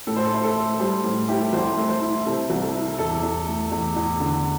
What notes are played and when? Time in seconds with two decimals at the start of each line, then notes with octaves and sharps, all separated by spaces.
0.07 A2 A4
0.16 C5
0.25 A4
0.32 E4 C5
0.44 A4
0.56 A3
0.80 G3 C5
1.04 A2
1.28 E4 G4
1.41 A4
1.53 C2 C5
1.77 A3
1.89 C5
2.02 E4
2.25 C3 A4
2.50 C2
2.62 A4
2.74 E4
2.98 E2 A4
3.23 E2
3.47 A3
3.71 E2
3.96 E2
4.20 D3